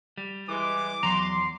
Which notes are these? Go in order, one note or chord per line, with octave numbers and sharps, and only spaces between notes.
G3
E3 G#3 D6
E2 F#3 A#5 C6